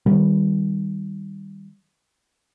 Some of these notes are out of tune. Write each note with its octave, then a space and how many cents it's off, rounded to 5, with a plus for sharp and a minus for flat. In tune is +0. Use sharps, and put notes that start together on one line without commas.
D#3 +0 G3 +0 B3 +0